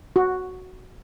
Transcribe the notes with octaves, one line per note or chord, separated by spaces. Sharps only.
F#4